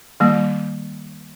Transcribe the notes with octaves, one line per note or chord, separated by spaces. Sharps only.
D#3 G3 A#3